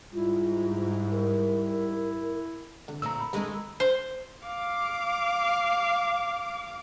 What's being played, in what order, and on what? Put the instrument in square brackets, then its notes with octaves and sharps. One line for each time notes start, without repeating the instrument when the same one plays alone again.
[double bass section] G#2 [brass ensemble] G3 [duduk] E4 [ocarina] F4
[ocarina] A#4
[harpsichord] D3
[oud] A#2 A3 C4 [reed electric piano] A#5 E6
[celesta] B5
[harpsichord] G2 D#4 [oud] D#3 G#3 A3
[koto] C5
[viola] F5 D6